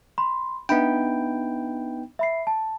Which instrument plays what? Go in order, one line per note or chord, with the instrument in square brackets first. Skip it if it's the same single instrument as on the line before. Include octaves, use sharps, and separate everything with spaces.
[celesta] B5 C6
[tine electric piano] B3 D#4 G5 [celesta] D4 E5 B5
[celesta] E5 B5 C7
A5